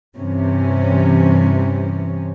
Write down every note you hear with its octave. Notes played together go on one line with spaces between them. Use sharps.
G2 C3 E3 C#4